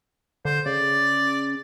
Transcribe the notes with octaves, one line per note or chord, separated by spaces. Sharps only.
D3 C5
C#3 D5